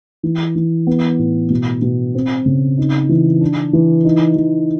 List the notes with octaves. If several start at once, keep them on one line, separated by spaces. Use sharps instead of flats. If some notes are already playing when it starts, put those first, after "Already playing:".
E3
E3
B3
A2
B2
B2
C4
C#3
D#4
E3
D4
E3
D#4
E3